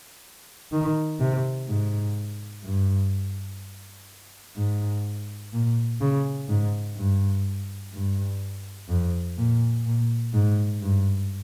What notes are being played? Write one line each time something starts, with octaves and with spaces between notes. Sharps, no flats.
D#3
C3
G#2
G2
G#2
A#2
C#3
G#2
G2
G2
F2
A#2
A#2
G#2
G2